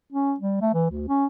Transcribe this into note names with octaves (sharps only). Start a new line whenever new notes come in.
C#4
G3
A3
E3
D2
C#4